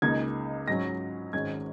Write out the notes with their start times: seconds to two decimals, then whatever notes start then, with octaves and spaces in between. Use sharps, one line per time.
0.02 C#2 C#3 A#3 D#4 G#6
0.68 G#2 F#3 C#4 A#6
1.33 G#1 G#2 G#3 C#4 G#6